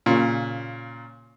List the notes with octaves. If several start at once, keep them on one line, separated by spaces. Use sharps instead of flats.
A#2 C#3